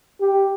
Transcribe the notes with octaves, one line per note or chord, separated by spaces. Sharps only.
G4